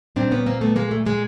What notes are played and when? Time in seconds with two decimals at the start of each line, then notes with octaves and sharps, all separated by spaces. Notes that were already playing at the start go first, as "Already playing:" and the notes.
0.16 A#2 G3 C4 D4
0.31 B3 C#4
0.46 A#3 C4
0.61 A3 B3
0.76 G#3 A#3
0.91 A3
1.06 G#3 A#3